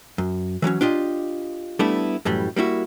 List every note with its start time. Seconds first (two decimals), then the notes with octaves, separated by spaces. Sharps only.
0.18 F#2
0.62 E3 F#3 A#3 C#4
0.81 D4 F4 G4 D#5
1.79 G3 A3 B3 D4 E4
2.25 F#2 A2 E3 G3
2.56 G3 A#3 E4 F#4